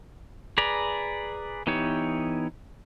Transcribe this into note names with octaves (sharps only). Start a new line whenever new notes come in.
G#4 B4 D5 A#5
E3 B3 D#4 G4 C#5